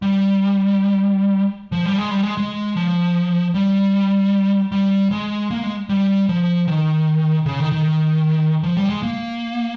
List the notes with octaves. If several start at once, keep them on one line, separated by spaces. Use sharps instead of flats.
G3
F3
G3
G#3
G3
G#3
G#3
F3
G3
G3
G#3
A#3
G#3
G3
F3
D#3
C#3
D#3
D#3
F3
G3
G#3
A#3